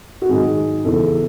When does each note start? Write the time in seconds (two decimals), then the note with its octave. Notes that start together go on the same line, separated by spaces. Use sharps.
0.22 F#4
0.29 G#2 D#3 F#3 G#4
0.84 E2 C#3 E3 A4